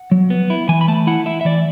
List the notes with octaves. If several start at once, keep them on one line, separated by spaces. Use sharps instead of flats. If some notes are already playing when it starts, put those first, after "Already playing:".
Already playing: F#5
F#3
B3
E4
E3 G#5
B5
A3 A5
E4 F#5
E4 E5
E5
E3 D5